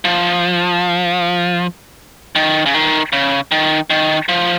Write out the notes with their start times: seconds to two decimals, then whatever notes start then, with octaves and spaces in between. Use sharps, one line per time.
0.05 F3
2.36 D#3
2.66 C#3
2.74 D#3
3.13 C#3
3.52 D#3
3.90 D#3
4.29 F3